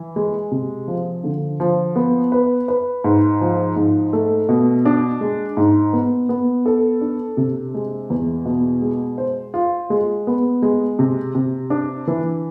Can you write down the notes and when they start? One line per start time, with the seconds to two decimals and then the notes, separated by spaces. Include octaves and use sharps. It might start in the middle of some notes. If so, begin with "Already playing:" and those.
Already playing: E3
0.16 G#3
0.51 C3
0.88 F3
1.24 D3
1.60 F3
1.96 B3
2.32 B4
2.68 B4
3.04 G#2
3.41 F3
3.76 G#2
4.13 A3
4.49 B2
4.85 D4
5.21 G#3
5.57 G#2
5.93 B3
6.29 B3
6.66 A4
7.01 D4
7.37 C3
7.74 G#3
8.10 E2
8.45 B2
8.82 G#3
9.18 C5
9.54 F4
9.90 G#3
10.27 B3
10.62 G#3
10.99 C3
11.35 C3
11.70 D4
12.07 E3